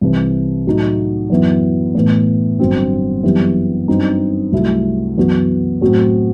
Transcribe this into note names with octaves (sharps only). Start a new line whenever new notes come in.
C2 C3 E3
A2 F#3 A3 D#4 F#4
F#2 E3 B3 E4
A2 E3 B3
G1 G2 F#3 C4
F#2 E3 G3 B3 E4
G2 F#3 C4 D#4
C2 C3 F#3 A3 E4
F#2 E3 B3 F#4
A2 F#3 C4 F#4